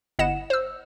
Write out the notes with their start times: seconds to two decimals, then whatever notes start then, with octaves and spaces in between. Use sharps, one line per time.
0.19 G1 E4 D#5 F#5 E7
0.50 C5 E6